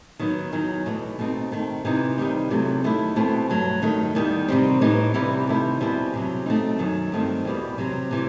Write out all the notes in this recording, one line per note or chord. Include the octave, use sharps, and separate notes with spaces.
D#3 F#3 B3 D#4
E2 D#3 F#3
E2 B2 A3
B2 A3 C4 D#4
D#3 A3 C4
C3 E3 B3 D#4
C3 D#3 G3 D#4
E2 C3 F#3 A3
D#3 A3 E4
E2 B2 A3 C4 E4
G2 F#3 A3
G2 D#3 A3
E2 D#3 G3
C3 D#3 G3 C4
A2 E3 B3 D#4
C3 E3 G3 B3 E4
C3 D#3 A3 E4
E2 B2 G3 C4 E4
E2 C3 F#3
B2 A3 C4 D#4
F#2 D#3 F#3
G2 D#3 A3 C4
E2 B2 G3
C3 F#3 C4
C3 E3